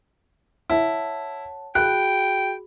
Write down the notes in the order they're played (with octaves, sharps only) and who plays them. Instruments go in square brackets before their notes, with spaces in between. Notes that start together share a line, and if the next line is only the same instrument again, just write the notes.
[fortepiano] E4 [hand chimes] C#5 F#5 A5
[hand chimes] F#4 G#4 B5 [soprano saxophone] G5 [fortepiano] F#6